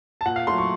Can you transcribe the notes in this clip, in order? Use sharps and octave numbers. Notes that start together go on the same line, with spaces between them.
A5
A#2 F#5
F5
F#3 A3 C6
C#6